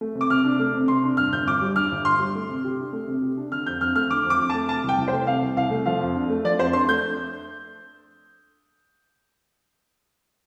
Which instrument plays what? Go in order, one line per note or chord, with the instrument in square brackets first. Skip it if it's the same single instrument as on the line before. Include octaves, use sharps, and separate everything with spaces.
[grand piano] A3
C3
[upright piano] D6
[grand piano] C3 [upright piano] F6
[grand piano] D4
A3
C3
[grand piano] C3 [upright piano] C6
[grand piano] D4
[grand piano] G2 [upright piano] F6
[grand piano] G1 [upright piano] G6
[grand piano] G1 [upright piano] D6
[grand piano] G3
[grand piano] G2 [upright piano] F6
[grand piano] G1
[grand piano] G1 [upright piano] C6
[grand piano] G3
A3
C3
G4
D4
A3
C3
G4
D4
[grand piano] D3 [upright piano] F6
[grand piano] F2 [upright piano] G6
[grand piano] F2 [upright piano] F6
[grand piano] A3 [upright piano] F6
[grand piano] D3 [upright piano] D6
[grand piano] F2
[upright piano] D6
[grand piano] F2
[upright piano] A5
[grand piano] A3
[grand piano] C3 [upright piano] A5
[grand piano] C2 [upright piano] G5
[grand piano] C2
[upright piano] C5
[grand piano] A3
[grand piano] C3 [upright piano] F5
[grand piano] C2
[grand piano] C2 [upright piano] F5
[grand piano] A3
[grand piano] F3 [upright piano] F5
[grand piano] F2
D4
A3
[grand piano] F3 [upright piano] D5
[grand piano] F2 [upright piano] C5
[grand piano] D4 [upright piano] C6
[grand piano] A3 [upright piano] G6